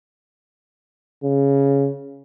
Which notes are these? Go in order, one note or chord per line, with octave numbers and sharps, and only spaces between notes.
C#3